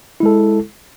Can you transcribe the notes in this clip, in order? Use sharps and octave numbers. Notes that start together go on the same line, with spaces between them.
G#3 E4 A4